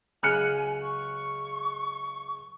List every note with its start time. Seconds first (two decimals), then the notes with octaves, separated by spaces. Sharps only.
0.23 C#2 C#3 F#3 G#5 F6 F#6 C#7
0.82 C#6